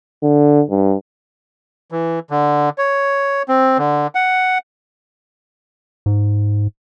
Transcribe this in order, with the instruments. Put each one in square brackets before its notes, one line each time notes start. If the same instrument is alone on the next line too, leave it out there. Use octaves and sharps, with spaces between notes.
[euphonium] D3
G2
[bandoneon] E3
D3
C#5
C4
D3
F#5
[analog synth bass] G#2